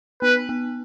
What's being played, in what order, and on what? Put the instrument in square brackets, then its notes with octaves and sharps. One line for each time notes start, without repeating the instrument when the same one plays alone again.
[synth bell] B3 [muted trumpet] B4
[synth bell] B3